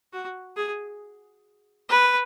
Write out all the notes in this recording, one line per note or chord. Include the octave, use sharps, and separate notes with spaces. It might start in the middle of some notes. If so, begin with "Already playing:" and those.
F#4
G#4
B4